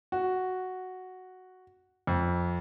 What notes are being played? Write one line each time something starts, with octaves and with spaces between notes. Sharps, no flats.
F#4
F2